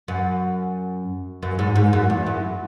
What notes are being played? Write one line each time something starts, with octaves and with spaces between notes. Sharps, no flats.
F#2
F#2
G#2
G#2
F#2
E2
F#2